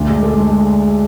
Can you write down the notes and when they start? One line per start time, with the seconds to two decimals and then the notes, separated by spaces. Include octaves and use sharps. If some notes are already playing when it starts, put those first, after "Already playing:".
Already playing: D2 D4
0.09 G#3
0.23 G#3 A4
0.33 G#4
0.39 G#3